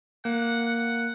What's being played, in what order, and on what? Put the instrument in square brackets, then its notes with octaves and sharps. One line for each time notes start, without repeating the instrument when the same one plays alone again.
[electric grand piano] A#3 [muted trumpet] F#5